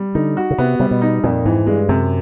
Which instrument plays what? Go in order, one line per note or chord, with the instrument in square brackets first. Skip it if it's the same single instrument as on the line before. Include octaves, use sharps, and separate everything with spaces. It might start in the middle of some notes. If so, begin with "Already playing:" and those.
Already playing: [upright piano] G3
[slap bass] D3 [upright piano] D#4
[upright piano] F#4
[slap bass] C#3
[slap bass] C3 [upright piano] B3
[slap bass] C3 [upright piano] G3
[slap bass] B2
[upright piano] D#4
[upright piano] F2 [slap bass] A#2
[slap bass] G#2 [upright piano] E3
[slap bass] G2 [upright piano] G#3
[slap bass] F#2 [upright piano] C3